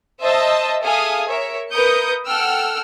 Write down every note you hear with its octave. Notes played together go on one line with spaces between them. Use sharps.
C5 D#5 E5 A5 D#6 E6
G#4 A4 E5 F5 G#5 D#6
A#4 C#5 E5
A#4 B4 D#6 G6 C#7
A4 F#5 G5 E6 F6